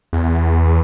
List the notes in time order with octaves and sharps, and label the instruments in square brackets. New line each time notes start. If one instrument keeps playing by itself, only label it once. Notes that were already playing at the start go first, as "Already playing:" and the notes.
[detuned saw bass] E2